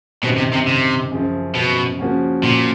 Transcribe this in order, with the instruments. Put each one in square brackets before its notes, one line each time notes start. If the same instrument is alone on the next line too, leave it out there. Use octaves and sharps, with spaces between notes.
[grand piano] F#2 D#3 G3 C4 [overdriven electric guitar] B2
[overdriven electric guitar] C3
C3
C3
[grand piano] F#2 C#3 F3
[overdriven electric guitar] B2
[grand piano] C#3 F3 A#3 C#4 F#4
[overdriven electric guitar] A#2